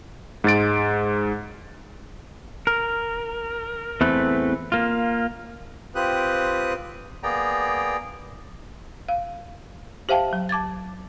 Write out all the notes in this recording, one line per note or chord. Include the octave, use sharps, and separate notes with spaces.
G#2 G#3 A6 D7
A#4
E2 A3 C4 B4
A#3 F4
C4 F4 G4 B4 D#6 F#6
A#3 B3 G#4 D5 G5 A#5
F5
G4 C5 E5 F5 G5 A5
F#3
A5 D6 G#6 A6